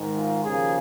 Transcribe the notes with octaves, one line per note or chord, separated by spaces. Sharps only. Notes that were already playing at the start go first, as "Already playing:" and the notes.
Already playing: G#2 D#3 G#3
F4
D#2 C#3 F3 A#3 G#4